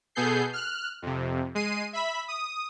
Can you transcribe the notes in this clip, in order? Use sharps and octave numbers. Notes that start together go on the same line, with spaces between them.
B2 B3 G#4 A4 G6 C7
F6 F#6
F2 C3
G#3 C7 D#7
E5 B5 B6
D#6